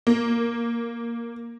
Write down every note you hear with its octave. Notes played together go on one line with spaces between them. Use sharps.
A#3